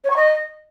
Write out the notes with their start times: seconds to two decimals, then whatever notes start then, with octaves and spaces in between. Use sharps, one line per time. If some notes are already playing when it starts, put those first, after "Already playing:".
0.04 C#5
0.10 C#6
0.16 D#5